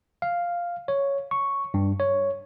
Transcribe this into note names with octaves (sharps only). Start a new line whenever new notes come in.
F5
C#5
C#6
G2
C#5